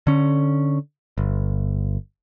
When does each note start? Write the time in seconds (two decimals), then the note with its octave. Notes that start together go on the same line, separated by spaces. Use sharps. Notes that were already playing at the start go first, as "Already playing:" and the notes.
0.07 D3 C#4
1.18 G1